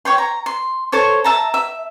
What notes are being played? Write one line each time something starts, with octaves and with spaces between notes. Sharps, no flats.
C#5 G5 C6
A#5
C6
A4 C5 C#5 C#6
E5 A5 A#5
E5